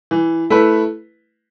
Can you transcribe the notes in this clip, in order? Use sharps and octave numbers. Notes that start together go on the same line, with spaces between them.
E3
A3 E4 B4